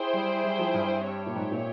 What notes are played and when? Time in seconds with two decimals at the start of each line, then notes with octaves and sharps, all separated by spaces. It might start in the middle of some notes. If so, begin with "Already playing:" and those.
Already playing: E4 G#4 C5 G5
0.13 G3
0.44 G3
0.59 F3
0.74 G2
1.05 C4 G4 C#5 E5
1.26 A#2
1.36 G#2
1.51 A#2